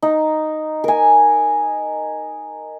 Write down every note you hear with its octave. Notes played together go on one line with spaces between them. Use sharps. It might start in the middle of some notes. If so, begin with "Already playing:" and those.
D#4
A#4 G#5